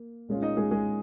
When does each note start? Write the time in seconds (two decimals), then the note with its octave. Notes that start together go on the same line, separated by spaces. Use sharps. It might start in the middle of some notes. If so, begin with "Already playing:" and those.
Already playing: A#3
0.28 A#2 G#3 C#4 F4
0.42 D#4 D#5
0.57 G#3 G#4
0.71 G#3 G#4